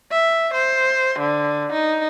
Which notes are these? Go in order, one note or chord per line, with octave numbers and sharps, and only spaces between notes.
E5
C5
D3
D#4